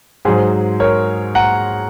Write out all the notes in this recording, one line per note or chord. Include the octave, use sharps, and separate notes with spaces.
G#2 F#3 G#4 C5
A#4 C#5
F#5 A#5